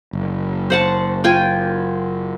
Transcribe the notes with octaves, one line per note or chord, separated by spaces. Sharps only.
F#1
C5 F#5 A5
F4 G5 G#5